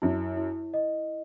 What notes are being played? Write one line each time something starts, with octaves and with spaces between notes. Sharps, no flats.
F#2 E4
E4
D#5